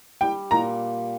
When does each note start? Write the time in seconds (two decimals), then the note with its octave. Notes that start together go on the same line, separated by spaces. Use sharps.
0.21 G3 G5
0.51 A#2 A#5